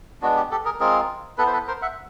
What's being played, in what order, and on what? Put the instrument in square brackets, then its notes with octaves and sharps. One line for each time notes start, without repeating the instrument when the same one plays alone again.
[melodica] G#3 B3 D4 F#4
G4
G4 A4
G#4 A#4
G#3 C4 F4 G#4 A#4
B3 E4 A4 B4
C5
A4 B4
A#4 C5
E5 F#5